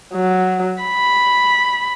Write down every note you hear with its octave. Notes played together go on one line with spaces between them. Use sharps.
F#3
B5